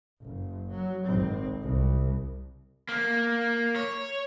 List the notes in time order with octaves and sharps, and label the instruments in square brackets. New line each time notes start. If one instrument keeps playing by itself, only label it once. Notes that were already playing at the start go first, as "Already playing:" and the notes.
[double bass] F#1
F#3
G#1 C4
C2
[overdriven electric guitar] A#3
C#5